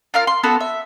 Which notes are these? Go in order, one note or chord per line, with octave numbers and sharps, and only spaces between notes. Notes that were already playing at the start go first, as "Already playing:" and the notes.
F4 A#4 F5 F6
C6
B3 F#4 A4 A5
E5